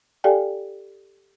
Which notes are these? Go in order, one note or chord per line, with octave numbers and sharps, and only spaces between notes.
G4 A4 D5 F5 G5 G#5